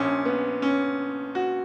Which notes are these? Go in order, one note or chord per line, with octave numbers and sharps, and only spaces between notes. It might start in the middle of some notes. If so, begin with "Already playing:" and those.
Already playing: A#1 A#2 C#4
B3
C#4
F#4